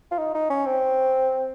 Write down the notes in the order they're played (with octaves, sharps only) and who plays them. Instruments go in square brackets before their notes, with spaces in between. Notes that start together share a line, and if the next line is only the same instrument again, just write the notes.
[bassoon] F4
D#4
D#4
C#4
C4